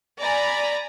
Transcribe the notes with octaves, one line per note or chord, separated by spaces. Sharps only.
D5 G#5 A#5 B5